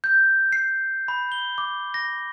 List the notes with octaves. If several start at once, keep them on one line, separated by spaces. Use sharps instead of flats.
G6
C7
B5
G7
D6
A#6